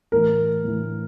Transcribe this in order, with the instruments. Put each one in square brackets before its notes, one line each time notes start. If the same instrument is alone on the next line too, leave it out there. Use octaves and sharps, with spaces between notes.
[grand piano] A2 E3 A#4
A2 E3